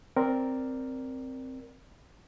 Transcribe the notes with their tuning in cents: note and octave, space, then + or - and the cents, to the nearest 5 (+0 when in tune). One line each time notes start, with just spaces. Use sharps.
C4 +0 A#4 +0 D5 +0